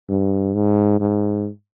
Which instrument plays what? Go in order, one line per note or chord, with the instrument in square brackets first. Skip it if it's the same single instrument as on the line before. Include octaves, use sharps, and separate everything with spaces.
[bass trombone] G2
G#2
G#2